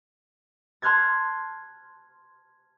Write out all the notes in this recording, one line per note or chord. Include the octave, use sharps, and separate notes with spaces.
A5 C6 F6 F#6 G#6 A6